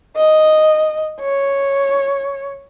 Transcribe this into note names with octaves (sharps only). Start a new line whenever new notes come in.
D#5
C#5